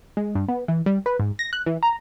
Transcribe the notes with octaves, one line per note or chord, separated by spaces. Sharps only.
G#3
G2
B3
E3
G3
B4
G#2
A#6
F#6
E3
A#5